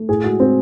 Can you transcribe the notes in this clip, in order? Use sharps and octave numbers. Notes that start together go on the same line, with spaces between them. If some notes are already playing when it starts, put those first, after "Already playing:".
Already playing: A3
A2 G#4
G#3 F#4
G#3 C4